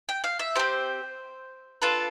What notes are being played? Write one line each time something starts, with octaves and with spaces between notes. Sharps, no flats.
G5
F5
E5
C4 G4 C5
D4 F4 A4 B4